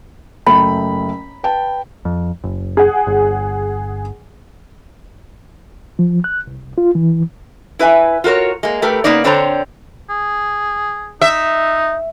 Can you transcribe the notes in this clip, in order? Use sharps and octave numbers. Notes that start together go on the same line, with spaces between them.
F#1 A3 G5 B5
B4 G5 A5
F2
F#1
G#4 F#5
G1
F3
F#6
C2
F4
E3
E4 B4 E5 G#5
F4 F#4 A#4 C#5
G#3 A#3
A3 G4 A#4 B4
C#3 A#3 B3 D#4 D5
D3 C4 D4 C5 C#5 A#5
G#4
D#4 E5